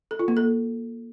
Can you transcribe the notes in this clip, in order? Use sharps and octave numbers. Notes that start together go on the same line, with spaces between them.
A4
F4
A#3
A4